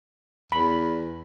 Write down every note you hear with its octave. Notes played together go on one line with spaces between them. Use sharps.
E2 B5